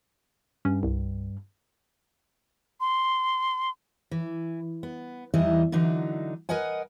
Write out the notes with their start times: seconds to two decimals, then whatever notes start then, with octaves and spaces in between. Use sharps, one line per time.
0.65 G2 C#4
0.83 C2
2.81 C6
4.11 E3
4.83 B3
5.34 E2 E3 G3 D#4 E4 D#5
5.72 D3 E3 F#3 D#4
6.49 A#4 B4 D#5 F#5 G#5